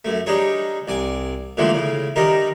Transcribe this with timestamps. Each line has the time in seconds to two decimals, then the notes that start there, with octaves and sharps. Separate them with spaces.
0.05 F#2 A3
0.26 G3 D4 D#4 G#4 C#5
0.88 C2 D5 G#5
1.57 A#2 D3 E3 F3 G#3 A3
1.73 A2 C#3
2.16 D#3 G3 D4 D#4 A#4